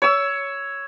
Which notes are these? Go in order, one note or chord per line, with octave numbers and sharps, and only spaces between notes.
C#5 E6